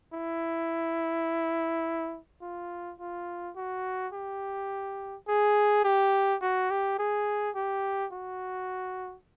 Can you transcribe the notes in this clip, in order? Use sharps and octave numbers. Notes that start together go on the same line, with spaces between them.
E4
F4
F4
F#4
G4
G#4
G4
F#4
G4
G#4
G4
F#4